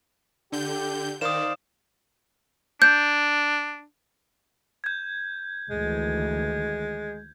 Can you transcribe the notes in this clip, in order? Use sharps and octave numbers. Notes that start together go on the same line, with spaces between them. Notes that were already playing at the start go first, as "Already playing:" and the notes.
D3 G4 G6
D#3 C5 D5 F5 D#6 E7
D4 G6
G6 G#6
D2 D#3 E3 G#3